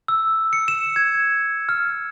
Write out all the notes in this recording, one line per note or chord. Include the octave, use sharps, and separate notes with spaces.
E6
C#7
E7
G#6
F6